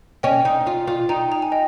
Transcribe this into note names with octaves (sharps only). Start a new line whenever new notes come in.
C#4 D#5 G5
D#4
F4
F4
D#4 G5 A#5
A#5
G#5
D#5 G5